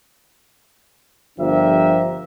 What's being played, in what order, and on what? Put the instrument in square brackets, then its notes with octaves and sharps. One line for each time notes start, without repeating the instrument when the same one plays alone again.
[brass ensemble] G1 F3 D4 G4 A#4 E5